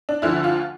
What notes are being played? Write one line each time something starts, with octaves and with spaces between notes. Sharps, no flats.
D4
D2 D3 F3 E4
F4